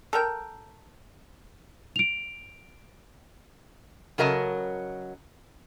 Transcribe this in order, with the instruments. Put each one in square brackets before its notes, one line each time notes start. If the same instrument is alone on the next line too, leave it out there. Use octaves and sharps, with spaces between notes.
[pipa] A4 A#4 G5
[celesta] D7 F7
[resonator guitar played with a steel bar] C#3 F#3 A#4 D#5 A5